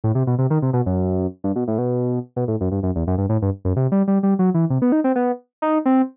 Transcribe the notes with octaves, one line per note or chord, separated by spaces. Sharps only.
A2
C3
B2
C3
D#3
C3
B2
F#2
G2
B2
A2
B2
B2
A2
F#2
G2
F#2
E2
F#2
G2
A2
G2
F#2
C3
G3
G3
G3
F#3
E3
C3
B3
D#4
C4
B3
D#4
C4